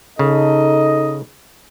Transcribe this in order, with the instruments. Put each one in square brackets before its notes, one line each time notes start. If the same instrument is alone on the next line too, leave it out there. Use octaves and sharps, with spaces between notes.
[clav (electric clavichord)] C#3 [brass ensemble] D#4 A4 D#5